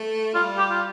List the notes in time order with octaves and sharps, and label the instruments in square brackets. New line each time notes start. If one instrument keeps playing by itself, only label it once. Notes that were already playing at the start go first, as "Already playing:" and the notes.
Already playing: [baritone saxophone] A3
[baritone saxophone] G3 [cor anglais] F4
[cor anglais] G4
F4